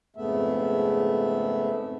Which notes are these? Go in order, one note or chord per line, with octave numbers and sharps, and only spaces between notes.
F2 G#2 C#3 A3 B3 E5